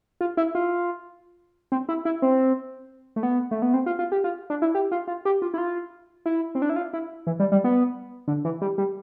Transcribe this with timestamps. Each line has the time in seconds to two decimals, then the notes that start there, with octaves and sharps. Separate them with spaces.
0.21 F4
0.37 E4
0.55 F4
1.72 C4
1.89 E4
2.05 E4
2.22 C4
3.16 A3
3.23 B3
3.51 A3
3.62 B3
3.74 C4
3.86 F4
3.99 F4
4.12 G4
4.24 F4
4.50 D4
4.62 E4
4.75 G4
4.92 F4
5.08 F4
5.25 G4
5.42 F4
5.54 E4
5.58 F4
6.26 E4
6.55 C4
6.62 D4
6.69 E4
6.76 F4
6.93 E4
7.27 E3
7.40 G3
7.52 G3
7.64 B3
8.28 D3
8.45 E3
8.62 G3
8.78 G3